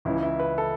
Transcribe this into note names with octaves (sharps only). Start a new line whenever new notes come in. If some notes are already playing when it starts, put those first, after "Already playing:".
C#2 C#3 E3 E4
E4
B4
A4